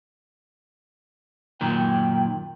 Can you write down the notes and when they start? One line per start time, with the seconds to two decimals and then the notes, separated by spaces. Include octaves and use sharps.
1.61 F#2 A#2 D#3 G5